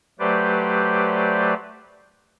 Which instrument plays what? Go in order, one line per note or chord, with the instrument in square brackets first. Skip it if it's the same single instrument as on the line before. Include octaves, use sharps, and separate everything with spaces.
[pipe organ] F#3 A3 G4 B4 C5 D5